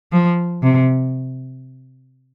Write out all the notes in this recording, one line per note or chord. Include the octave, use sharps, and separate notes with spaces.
F3
C3